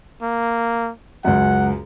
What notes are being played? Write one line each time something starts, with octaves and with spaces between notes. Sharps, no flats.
A#3
C#2 F#2 F#5